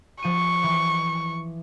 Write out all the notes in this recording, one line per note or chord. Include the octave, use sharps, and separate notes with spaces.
F3 C#6 D#7
E3